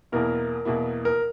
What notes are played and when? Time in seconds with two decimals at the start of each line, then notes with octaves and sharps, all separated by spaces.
0.12 E2 B2 A#3 E4 A#4
0.65 E2 B2 A#3 E4
1.05 A#4